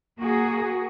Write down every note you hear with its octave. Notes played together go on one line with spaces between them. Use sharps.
A#3 F#4 G#4